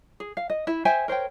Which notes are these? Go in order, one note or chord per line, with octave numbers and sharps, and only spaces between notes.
G#4
F5
D#5
E4 E5
C5 E5 G5 G#5
A#4 C5 C#5 G5